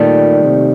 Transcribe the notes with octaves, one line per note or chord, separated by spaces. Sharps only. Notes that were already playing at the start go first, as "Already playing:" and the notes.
Already playing: A#2 D#3 G3 A3
C3